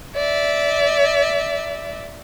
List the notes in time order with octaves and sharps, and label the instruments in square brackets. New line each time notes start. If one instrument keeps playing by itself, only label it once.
[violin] D5 E5